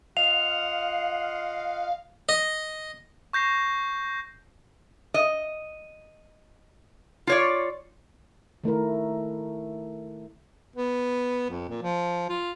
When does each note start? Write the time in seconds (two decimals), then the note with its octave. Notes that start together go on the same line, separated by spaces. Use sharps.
0.17 F4 D#5 F5 F#5 F7
2.29 D#5
3.33 C#6 G6 A#6 C7
5.14 D#5
7.27 F4 C#5 D5
8.64 D#3 A3 E4 A#4
10.76 B3
11.50 F2
11.69 A#2
11.82 F3
12.29 F4